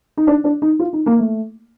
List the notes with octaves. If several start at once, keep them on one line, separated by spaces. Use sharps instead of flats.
D#4
D4
D4
D#4
F4
D#4
A#3
A3